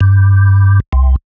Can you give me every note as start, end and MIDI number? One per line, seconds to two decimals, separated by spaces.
0.01 0.80 43
0.93 1.16 36